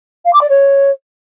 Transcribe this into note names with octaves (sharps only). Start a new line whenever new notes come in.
F5
D6
D5
C#5